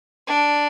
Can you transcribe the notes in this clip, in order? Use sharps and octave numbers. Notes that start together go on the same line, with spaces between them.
D4